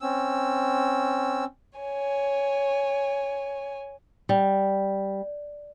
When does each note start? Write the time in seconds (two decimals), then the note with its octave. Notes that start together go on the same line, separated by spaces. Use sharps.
0.01 C4 C#4 E6
1.79 C#5 G#5
4.29 G3